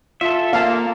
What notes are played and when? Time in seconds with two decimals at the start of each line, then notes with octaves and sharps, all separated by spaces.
0.21 F4 A4 E5
0.53 A#3 F5 A5